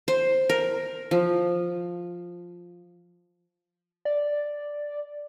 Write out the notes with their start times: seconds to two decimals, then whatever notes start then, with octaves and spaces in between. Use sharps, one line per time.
0.08 C5
0.49 A#4
1.11 F3
4.05 D5